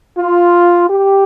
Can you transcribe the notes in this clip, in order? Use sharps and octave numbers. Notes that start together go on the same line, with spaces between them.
F4
G4